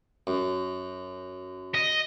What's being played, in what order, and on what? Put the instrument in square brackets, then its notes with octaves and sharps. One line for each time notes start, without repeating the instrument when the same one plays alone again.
[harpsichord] F#2
[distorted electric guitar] D#5